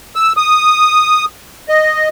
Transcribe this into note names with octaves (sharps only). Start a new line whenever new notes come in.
E6
D#6
D#5